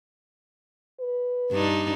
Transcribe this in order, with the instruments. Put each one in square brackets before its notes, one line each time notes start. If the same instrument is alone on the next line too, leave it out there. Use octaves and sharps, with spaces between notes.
[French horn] B4
[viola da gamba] G2 D4 D#4